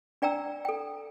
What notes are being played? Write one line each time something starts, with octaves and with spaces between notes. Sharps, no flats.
D4 D5 G5 A#5 E6
A4 G5